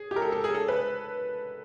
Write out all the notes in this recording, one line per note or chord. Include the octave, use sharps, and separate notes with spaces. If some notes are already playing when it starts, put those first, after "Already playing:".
Already playing: G#4
G4
A#4
A4
A4
G#4
A4
B4